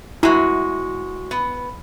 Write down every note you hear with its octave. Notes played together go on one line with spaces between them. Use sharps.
G#3 E4 F#4
B3